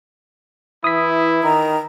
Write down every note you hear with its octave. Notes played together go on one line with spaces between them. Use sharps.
E3 E4 D#6 B6
D#3 A#5